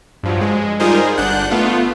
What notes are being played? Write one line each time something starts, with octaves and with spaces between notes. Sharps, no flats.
G2 F3 F#3
G#3
G3 D#4 F4 G#4 A#4 C5
G#4
G1 D4 F#5 F#6 G6
A3 B3 F4